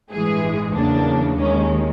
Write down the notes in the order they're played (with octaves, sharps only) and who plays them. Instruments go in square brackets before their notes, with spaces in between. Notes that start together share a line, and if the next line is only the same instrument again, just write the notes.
[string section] A1 G2 E3 G#3 G#4
E2 C#3 F#3 A#3 D4
D#2 D#3 G#3 C#4